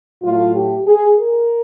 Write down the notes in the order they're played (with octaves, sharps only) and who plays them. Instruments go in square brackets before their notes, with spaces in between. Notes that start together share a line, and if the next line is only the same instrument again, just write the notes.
[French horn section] A2 F#3 A3 F4
G4
G#4
A#4